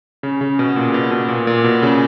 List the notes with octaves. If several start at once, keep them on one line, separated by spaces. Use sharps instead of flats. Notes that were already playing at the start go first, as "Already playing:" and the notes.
C#3
C#3
B2
A#2
B2
B2
A#2
A#2
B2
C#3